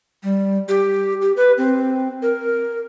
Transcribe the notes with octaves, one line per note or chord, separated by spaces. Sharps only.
G3
G4
G4
B4
C4
A#4